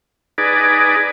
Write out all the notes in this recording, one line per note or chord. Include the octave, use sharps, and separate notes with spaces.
D#4 G#4 B4 D5